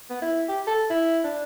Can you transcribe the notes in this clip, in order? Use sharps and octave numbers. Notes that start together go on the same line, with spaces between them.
B3
E4
G4
A4
E4
D4